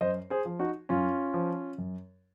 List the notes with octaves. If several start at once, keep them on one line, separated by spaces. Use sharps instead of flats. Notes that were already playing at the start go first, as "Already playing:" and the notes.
F#2 C5 D#5
G#4 C5
F3
D#4 F#4
F#2 C#4 F4
F3
F#2